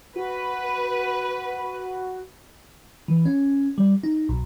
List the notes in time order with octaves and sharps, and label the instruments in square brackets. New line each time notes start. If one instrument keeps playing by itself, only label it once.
[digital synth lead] F#4 [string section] B4
[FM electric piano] E3
C#4
G3
D#4
B1